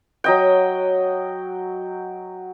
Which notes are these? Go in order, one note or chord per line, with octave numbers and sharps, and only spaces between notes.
F#3 D#5 G5